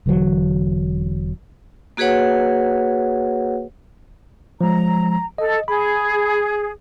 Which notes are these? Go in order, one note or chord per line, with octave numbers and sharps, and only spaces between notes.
E1 D3 E3 F#3
A#3 F#4 G#4 B4 C#5 F#5
F3 G#3 A#5
A4 D#5
G#4 B5